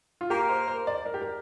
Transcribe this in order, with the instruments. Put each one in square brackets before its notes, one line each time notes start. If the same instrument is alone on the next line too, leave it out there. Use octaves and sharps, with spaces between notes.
[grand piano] F4
[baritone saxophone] A#3 [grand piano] G4
[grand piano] C5
C5
D5
A#4
G4
A#4